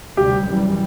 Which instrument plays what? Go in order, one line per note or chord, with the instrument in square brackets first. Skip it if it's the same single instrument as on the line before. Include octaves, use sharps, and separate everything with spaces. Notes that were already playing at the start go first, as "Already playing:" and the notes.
[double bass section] D2 C3 G3 [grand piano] G4
[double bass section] F#2 E3 G3